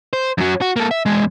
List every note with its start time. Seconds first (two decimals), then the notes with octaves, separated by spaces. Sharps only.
0.13 C5
0.38 F#2 F#3
0.61 F#4
0.76 A#3 A4
0.91 E5
1.06 E2 G#3